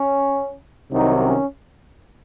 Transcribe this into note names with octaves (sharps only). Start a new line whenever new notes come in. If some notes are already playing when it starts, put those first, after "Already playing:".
Already playing: C#4
C2 C3 D#3 F#3 D#4
C#4